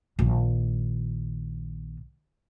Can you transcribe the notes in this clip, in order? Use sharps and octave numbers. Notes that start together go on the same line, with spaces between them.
A#1 D#3